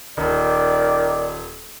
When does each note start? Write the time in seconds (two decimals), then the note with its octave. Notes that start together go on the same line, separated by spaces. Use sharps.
0.17 D#1 D#3 D5